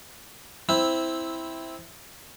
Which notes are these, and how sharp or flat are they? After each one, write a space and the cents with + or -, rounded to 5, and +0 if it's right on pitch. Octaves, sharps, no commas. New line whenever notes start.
C4 +0 E4 -5